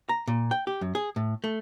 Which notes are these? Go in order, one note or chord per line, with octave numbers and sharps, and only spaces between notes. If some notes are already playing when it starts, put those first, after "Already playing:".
A#5
A#2
G5
G4
F#2
G#4
A2
A3